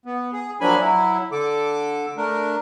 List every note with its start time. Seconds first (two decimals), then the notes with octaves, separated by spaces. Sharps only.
0.06 B3
0.33 G#4
0.61 F3 F#3 A#3 D4 G#5 B5
0.80 F#3 E4
1.32 D3 A4 D6
2.17 A3 D4 A#4